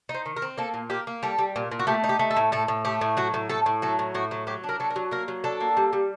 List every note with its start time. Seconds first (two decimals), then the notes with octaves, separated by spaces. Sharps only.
0.09 D#4
0.14 C5
0.26 D#3
0.37 A#4
0.42 C4
0.58 A#3 A4
0.74 A#2
0.90 A#3 G4
1.07 A#3
1.23 G3 A4
1.38 G3
1.56 A#2
1.72 A#2
1.79 F#4
1.87 A3 G4
2.04 D#4
2.09 G4
2.19 A3
2.31 A4
2.37 A2
2.52 A2 A4
2.68 A2
2.85 A3 G4
3.01 A2
3.17 F#3 F#4
3.34 A2
3.49 A2 A4
3.66 A2
3.82 F#3 A4
3.99 A2
4.15 A2 F#4
4.31 F#3
4.47 F#3 G4
4.64 D4
4.69 A#4
4.80 F#3 A4
4.90 A#4
4.96 F#3
5.11 A#3 A#4
5.28 F#3
5.44 D4 A4
5.60 A#3
5.77 G3
5.93 G3